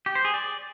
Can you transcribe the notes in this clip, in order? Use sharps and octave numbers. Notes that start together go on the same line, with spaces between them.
G4
C5
G#4
D5